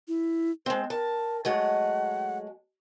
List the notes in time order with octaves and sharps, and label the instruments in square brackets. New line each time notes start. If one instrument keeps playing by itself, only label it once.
[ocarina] E4
[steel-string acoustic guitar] G#3 C4 [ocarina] C5
[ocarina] A#4 [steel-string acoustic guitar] A5
[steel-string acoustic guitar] F#3 G#3 A3 [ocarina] F#5